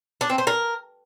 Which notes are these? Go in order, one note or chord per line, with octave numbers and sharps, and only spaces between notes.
D4
C4
C5
A#4